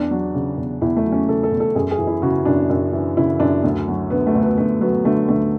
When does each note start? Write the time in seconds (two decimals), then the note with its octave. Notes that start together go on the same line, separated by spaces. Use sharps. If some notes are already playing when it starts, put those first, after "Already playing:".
Already playing: E2 D4
0.11 F#3
0.34 C#3
0.57 E2
0.82 E2 E4
0.97 A3
1.05 F#3
1.12 C#4
1.28 C#3 A4
1.43 A4
1.51 E2
1.60 A4
1.75 F#2 G#4
1.91 G#4
1.99 E3
2.07 E4
2.22 C#3 F#4
2.45 F#2 D4
2.70 F#2
2.93 E3
3.17 C#3 E4
3.40 F#2 D4
3.64 D2
3.88 F#3
4.10 D3 B3
4.27 A3
4.35 D2
4.42 B3
4.58 D2 A3
4.81 F#3 B3
5.05 D3 A3
5.28 D2 A3